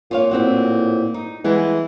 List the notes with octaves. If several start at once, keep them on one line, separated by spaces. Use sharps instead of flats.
A#2 F4 C#5 F5
A2 C4 F#4
D#4
E3 G3 G#3 B3